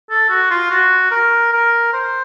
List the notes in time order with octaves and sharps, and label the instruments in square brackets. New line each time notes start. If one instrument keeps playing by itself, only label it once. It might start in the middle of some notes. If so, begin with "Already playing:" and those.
[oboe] A4
F#4
F4
F#4
A#4
A#4
C5